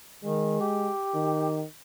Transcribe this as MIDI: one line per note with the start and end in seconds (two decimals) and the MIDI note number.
0.24 0.58 51
0.24 0.91 56
0.60 1.58 67
1.15 1.65 51